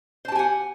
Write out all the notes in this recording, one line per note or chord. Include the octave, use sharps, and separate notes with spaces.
G4 C5 F#5 G#5 A5